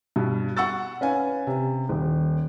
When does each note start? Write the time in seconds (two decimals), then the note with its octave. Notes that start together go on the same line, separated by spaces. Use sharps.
0.16 G2 B2
0.57 F#5 C#6 E6 A6
1.01 C#4 B4 F5 G#5
1.47 C3
1.89 D#1